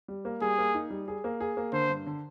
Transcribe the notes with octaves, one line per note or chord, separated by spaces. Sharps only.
G3
A#3
G3 G#4
A#3
D#4
G3
G#4
A#3
G#4
A#3
D3 C5
G2
D3